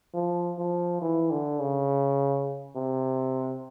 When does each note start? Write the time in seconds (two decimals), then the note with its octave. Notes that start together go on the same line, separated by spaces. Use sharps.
0.14 F3
0.59 F3
1.02 E3
1.31 D3
1.60 C#3
2.76 C3